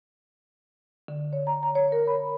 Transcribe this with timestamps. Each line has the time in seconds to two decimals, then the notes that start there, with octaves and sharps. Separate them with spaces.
1.08 D3
1.33 C#5
1.47 A#5
1.63 A#5
1.75 C#5
1.92 A#4
2.07 B5